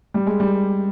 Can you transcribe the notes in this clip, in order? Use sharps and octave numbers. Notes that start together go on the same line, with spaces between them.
G3
G#3
G3